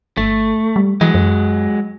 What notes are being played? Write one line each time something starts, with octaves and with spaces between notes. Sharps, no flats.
G1 A3
G3
E3 F#3 G#3
F#2